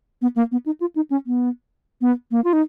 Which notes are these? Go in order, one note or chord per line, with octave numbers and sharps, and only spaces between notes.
B3
A#3
B3
D#4
F4
D#4
C#4
B3
B3
A#3
F4
D#4